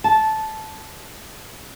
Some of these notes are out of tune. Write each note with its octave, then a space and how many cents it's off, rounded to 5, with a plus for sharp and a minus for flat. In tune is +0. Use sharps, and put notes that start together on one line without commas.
A5 -10